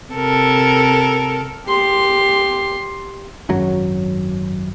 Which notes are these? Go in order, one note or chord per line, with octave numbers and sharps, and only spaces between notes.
C3 A4 A#4
G4 C6
G#1 F#2 F#3